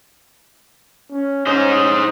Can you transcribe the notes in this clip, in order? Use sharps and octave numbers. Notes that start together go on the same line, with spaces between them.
C#4
C#4 D#4 C5 D#5